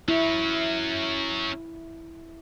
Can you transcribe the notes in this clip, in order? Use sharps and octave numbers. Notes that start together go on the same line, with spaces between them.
F#3 C#4 E4